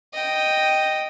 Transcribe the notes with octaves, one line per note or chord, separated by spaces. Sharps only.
D#5 G5